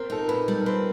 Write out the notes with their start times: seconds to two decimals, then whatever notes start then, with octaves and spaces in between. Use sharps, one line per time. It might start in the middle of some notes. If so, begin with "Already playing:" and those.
Already playing: C4 A#4
0.10 D#4 A4
0.21 A#4
0.28 A#2 B4
0.48 G3
0.61 A#4
0.66 C4 B4